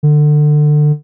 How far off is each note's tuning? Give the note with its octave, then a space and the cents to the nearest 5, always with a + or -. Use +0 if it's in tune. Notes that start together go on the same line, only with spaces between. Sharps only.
D3 +25